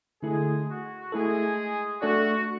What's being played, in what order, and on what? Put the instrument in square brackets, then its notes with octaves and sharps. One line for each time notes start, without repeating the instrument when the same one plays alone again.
[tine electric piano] D3 A3 E4 A4 [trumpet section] G#3 G#4
[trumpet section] F#4
[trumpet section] G#3 G#4 [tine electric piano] A3 E4 A4
[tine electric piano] A3 D4 A4 D5 [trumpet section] F#4